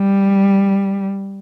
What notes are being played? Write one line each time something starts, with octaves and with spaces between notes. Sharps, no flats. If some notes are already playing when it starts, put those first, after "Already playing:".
Already playing: G3